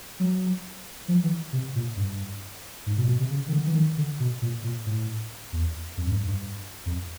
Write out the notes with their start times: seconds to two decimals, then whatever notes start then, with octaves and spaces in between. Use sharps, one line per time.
0.20 F#3
1.08 F3
1.24 E3
1.53 C3
1.75 A#2
1.97 G2
2.86 G#2
2.97 B2
3.04 A#2
3.08 B2
3.19 C3
3.31 C#3
3.48 D#3
3.53 D3
3.67 E3
3.75 D#3
3.97 D3
4.20 B2
4.42 A#2
4.64 A#2
4.86 A2
5.52 E2
5.97 F2
6.07 F#2
6.12 G2
6.27 G2
6.86 F2